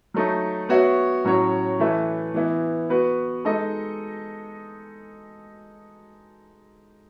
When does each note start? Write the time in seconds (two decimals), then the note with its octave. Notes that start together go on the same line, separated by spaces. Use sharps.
0.14 F#3 A3 D#4
0.69 B3 F#4 C#5 E5
1.25 A2 F#3 C#4 F#4 C#5
1.80 E3 A3 E4 B4 E5
2.34 E3 B3 E4
2.90 B3 F#4 B4
3.45 G#3 D#4 A4 D#5